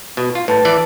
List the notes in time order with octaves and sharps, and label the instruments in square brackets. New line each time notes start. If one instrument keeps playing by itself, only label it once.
[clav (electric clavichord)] B2
F4
[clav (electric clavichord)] A2 [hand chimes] B4 A5 A6
[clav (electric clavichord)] E3 D5